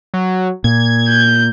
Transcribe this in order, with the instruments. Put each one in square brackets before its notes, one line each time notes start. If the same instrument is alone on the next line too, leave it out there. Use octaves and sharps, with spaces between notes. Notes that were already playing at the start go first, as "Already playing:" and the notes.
[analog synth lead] F#3
[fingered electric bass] A#2 [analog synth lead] G#6
[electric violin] G6